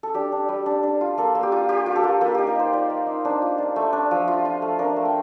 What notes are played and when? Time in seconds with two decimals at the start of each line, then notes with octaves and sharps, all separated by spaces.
0.03 A4
0.14 D4 G4
0.32 D4
0.49 G3
0.66 D4
0.83 D4
1.01 F4
1.18 A#3 A4
1.35 A#3
1.43 G4
1.52 F4
1.69 F4 G4
1.86 F4
1.96 A4
2.04 A#3
2.21 A#3 F4
2.35 D#4 G4
2.47 A#4
2.55 D#4 C5
2.73 D#4 D5
2.90 A#3
3.07 D#4
3.25 D4 C5
3.42 F4
3.58 D4
3.76 A3
3.93 D4
4.11 F3
4.28 F4
4.45 F4
4.62 A3
4.79 D4 A#4
4.96 A3
5.05 G5